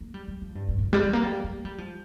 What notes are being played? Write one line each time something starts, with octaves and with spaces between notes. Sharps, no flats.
A#3
G3
G3
F3
G2
G2
A#2
G2
G3
G3
A#3
G3
A#3
G3
F3